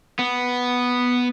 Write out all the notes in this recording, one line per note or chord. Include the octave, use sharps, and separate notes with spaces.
B3